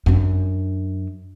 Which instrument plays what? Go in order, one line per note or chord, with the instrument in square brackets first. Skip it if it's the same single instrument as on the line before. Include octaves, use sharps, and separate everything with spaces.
[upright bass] F#2 D4